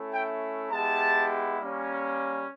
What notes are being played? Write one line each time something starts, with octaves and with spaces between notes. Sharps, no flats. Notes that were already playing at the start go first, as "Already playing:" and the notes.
Already playing: A3 C#4 E4
G5
G#3 B3 E4 G4 A5
G3 A#3 C#4